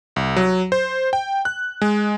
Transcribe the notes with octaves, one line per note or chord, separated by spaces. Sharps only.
C2
F#3
C5
G5
F#6
G#3